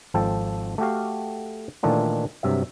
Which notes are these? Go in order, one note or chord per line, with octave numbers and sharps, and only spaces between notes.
G#1 F3 A4 G5
A3 F#4 G4 F5
A#2 D#3 E3 A3 D4 F4
G2 C3 F#3 E5